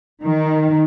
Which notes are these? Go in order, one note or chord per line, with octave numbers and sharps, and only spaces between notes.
D#3